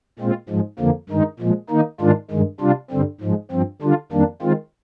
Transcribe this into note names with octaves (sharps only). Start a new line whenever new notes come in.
A#2 G#3 C4 F4
G#2 F3 G#3
F2 D3 F3 A#3
G2 D#3 G#3 D#4
A#2 F3 G#3
D#3 A#3 D#4
G#2 D#3 G#3 D4 F4
G2 D#3 G#3
C3 G3 D4 F4
G2 D3 G3 C4
G#2 F3 G#3
G2 F3 C4
D3 G3 D4 F4
F2 D#3 G3 A#3 D4
D#3 G#3 C4 F4